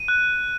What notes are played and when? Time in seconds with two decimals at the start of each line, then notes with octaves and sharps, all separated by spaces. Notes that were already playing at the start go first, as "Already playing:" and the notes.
Already playing: D#7
0.08 F#6